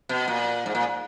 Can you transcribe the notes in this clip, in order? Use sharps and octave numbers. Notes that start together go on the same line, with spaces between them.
B2
A#2
G#2
A#2